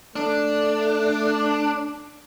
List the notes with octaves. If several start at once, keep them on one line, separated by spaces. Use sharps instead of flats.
A3 D4